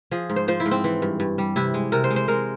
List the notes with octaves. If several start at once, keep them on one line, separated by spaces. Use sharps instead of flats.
F3 G#4
G#2
C5
F3 C5
E4
G#2
C4
E3
G2
G2
G3
C3 E4
G#3
C3 A#4
C5
G#3
C5
G#3 A#4